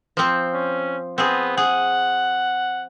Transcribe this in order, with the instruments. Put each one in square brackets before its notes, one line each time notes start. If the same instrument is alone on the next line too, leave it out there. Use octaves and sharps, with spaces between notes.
[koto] F3 C4
[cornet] C#4
[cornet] B3 [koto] C4 G#4
[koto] G#4 [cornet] F#5